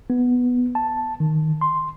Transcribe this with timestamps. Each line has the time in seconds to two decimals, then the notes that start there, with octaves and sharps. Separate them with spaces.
0.10 B3
0.75 A5
1.20 D#3
1.61 C6